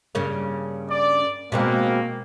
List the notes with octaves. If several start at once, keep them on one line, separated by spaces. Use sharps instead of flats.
G2 C#3 A#3
D5
B2 G#3 A#3 C4